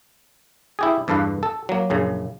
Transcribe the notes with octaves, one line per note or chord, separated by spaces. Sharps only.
E4 G4 G#4
E2 G2 A4 B4 F5
A4
F#3 A#3
A#1 F#2 C#3